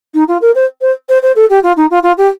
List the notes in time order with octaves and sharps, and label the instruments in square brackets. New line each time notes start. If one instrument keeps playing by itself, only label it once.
[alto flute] D#4
F4
A#4
C5
C5
C5
C5
A4
G4
F4
D#4
F4
F4
G4